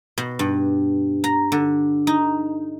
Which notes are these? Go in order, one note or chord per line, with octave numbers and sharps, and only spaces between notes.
B2
G2
A#5
D3
D#4